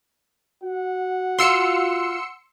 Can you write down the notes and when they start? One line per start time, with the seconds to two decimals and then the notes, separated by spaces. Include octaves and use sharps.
0.63 F#4 F#5
1.39 F4 F5 C6 E6 C#7